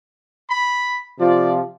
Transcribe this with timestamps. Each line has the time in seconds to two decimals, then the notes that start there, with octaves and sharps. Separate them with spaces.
0.49 B5
1.20 C3 F3 D5